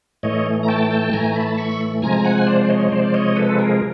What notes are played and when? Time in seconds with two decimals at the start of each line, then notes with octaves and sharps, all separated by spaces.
0.23 A2 E3 A3 C#5 D#5
0.63 A#5
0.68 G5 A5
0.91 G5 A5
1.13 A2 E3 A3 G#5 A#5
1.36 A5 B5
1.57 B5 C#6
2.02 C3 F3 G#3 G#5 A#5
2.25 F#5 G#5
2.47 C5 D5
2.69 C#5 D#5
2.91 C3 F3 G#3 C5 D5
3.14 C#5 D#5
3.36 A4 B4
3.49 A4
3.59 G#4 A#4